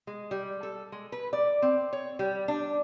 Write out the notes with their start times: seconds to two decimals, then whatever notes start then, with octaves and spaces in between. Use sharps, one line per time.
0.07 G#3
0.31 G3
0.63 A4
0.92 G#3
1.12 B4
1.33 D5
1.62 C4
1.93 C#5
2.19 G3
2.48 D4